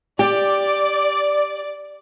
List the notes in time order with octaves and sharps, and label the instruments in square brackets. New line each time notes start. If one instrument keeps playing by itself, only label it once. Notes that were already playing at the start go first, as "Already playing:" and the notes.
[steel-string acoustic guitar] G4 [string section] D5